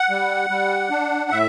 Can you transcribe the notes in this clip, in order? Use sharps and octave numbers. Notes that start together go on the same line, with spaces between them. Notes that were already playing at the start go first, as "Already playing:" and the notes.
Already playing: F#5
G3
G3
D4
A2 E5